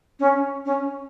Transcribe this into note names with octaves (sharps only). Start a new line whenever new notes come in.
C#4
C#4